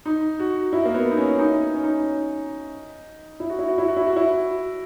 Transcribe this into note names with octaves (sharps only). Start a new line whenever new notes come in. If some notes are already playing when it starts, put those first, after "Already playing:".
D#4
F#4
E4
A#3
B3
D#4
C#4
D#4
C#4
D#4
E4
F#4
E4
F#4
E4
F#4
E4
F#4
E4